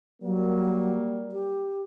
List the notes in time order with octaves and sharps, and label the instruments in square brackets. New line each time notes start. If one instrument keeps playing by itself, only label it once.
[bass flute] F#3 [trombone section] G3 A#3
[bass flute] G4